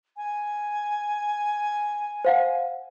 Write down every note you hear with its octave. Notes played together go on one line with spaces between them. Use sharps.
G#5
C5 F5 F#5